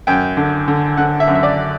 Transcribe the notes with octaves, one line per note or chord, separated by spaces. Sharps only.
F#2 G5
D3
D3
D3 F#5
E5
F#2
E5
D5